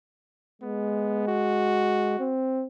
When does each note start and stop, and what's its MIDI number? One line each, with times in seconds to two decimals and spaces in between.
0.62 2.20 56
0.62 1.25 59
1.27 2.35 66
2.20 2.66 60